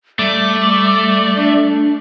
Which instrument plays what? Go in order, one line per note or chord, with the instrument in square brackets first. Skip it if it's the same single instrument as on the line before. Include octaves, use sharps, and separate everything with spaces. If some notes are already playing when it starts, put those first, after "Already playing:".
[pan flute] G3 [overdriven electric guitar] A3 [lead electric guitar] D5
[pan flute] D4